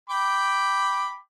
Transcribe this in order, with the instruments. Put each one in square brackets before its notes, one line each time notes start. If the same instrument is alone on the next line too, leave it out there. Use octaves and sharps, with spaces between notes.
[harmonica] G5 B5 D6